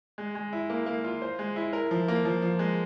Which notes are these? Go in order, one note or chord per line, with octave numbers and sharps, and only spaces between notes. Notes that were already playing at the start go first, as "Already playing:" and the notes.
G#3
G#3
E4
A#3
A#3
F4
C5
G#3
E4
A#4
F3
A#3
F3
F3
G#3